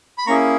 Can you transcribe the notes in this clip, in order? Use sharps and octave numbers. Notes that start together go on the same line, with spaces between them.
B5
A#3 C#4 E4 G#4 A#5 C#6